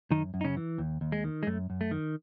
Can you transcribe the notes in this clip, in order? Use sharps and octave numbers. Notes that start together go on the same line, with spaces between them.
F#2 D#3 D#4
F#2
D#4
C#3 C#4
E3
D#2
D#2
G#3
D#3
G#3
F#2 A3
F#2
A3
D#3